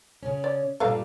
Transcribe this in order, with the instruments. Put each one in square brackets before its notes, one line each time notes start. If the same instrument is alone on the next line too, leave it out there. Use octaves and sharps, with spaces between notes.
[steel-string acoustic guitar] C#3 C#4
[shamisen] D5
[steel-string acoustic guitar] G2 A#2 G3 [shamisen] A4 B4 F5